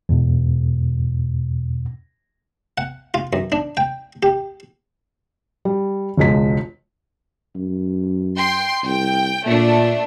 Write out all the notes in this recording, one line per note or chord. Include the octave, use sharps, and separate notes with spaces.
E2 G#2 B2
F#5
F4
F#2
D4
G5
G4
G3
E1 C#2 G#3 B6
F#2
G5 C6
C2 G5
A#2 A3 D4